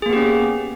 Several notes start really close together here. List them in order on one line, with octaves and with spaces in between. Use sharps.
G#4 A#3 B3 G4 C#4